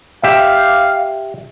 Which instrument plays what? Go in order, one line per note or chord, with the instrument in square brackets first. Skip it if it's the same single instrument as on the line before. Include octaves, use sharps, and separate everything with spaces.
[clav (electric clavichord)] G4 E5 [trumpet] F5